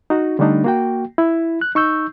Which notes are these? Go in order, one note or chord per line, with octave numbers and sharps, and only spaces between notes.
D#4 F#4
D3 G3 A3 D4 D#4
A#3 F#4 G5
E4
F#6
D#4 C#6 E6 G6